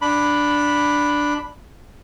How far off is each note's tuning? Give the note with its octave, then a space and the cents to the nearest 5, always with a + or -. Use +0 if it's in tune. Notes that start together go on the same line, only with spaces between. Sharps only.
D4 +0 B5 +0